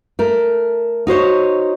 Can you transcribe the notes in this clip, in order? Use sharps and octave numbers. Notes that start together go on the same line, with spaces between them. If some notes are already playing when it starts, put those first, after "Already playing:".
A3 A#4
D#4 F#4 C5 C#5